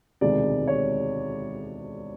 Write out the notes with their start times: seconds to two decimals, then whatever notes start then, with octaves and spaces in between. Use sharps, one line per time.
0.21 E1 D2 C3 D#3 G#3 D5
0.68 C#5